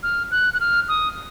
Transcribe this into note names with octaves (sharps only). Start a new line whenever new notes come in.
F6
F#6
F#6
F6
D#6